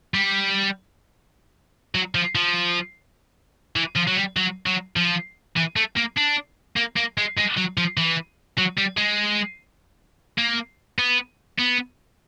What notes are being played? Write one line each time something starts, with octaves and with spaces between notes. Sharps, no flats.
G3
F#3
F3
F3
E3
F3
F#3
G3
F#3
F#3
F3
E3
A3
A#3
D4
A#3
A#3
G#3
G#3
F#3
F3
E3
F#3
G3
G#3
A#3
B3
B3